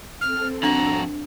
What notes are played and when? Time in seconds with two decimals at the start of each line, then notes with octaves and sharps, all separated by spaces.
0.21 C4 A4 F6
0.63 F2 D4 F#4 A#5